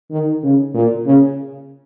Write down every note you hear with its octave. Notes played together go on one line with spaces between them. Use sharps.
D#3
C#3
A#2
C#3